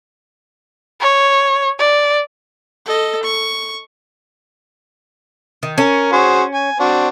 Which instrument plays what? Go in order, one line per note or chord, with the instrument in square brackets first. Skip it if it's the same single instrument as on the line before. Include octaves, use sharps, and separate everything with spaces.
[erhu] C#5
D5
[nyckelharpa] A4 D#5
C#6
[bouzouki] D#3
[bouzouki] C#4 [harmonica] A#4
[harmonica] F#4 G#4 C5
G#5
C4 D4 F#4